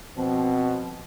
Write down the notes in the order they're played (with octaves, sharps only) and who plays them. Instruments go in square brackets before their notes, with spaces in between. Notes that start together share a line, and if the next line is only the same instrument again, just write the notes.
[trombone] B2 [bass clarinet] F3 [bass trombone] C4